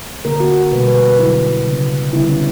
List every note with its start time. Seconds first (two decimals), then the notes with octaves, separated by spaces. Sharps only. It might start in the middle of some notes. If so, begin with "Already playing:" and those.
0.25 D3 A#3 A#4
0.40 F#4
0.72 B2 G3 A#3 B4
0.88 B4
1.03 B4
1.19 D3 F#3 B3 E4
1.66 C#3 F#3 B3
2.13 D3 G3 B3 E4
2.29 C#4